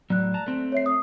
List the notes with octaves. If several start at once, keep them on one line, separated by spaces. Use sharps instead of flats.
A2 F#3 D5 F#6
A5 A#5
A3 C4
C#5 E5 C7
D#6